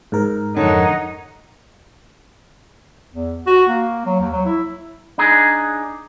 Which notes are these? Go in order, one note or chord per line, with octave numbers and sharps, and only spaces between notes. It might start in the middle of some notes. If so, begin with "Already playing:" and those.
G#2 A#4
F2 D3 D#4 C#5 F#5
E2
F#4
A#3
F#3
D#2
F#3
E4
D4 D#4 G#4